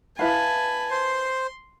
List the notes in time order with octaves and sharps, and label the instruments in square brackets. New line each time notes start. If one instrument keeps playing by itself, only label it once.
[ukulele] E4 B4 F5 [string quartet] G#5 A5 B5
[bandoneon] C5 [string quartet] C6